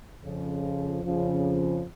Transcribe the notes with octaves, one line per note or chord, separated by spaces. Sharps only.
F2 C#3 F3
F2 C#3 F3